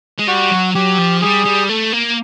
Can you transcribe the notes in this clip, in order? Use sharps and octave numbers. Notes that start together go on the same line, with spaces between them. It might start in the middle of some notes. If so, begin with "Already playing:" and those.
G#3
G3 F#4
F#3
F#3 G4
F3
G3 G#4
G3
A3
A#3